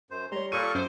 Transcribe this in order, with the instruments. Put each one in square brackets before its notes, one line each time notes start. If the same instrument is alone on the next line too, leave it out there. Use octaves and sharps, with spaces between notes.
[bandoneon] F#2 C5
[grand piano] G3 C#5 [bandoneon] A#5 C6
[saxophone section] A#2 [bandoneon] G3 A4 C#6 [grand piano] D#7
[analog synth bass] F#2 [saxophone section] C5 [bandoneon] D6